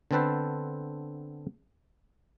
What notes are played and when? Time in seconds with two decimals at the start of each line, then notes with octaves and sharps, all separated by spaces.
0.11 D3 B3 C4 A4 B4 C5